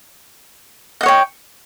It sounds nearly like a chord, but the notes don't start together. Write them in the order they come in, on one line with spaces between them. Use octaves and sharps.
D#5 F#5 C#5 G5